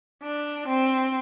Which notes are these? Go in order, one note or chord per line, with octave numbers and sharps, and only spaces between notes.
D4
C4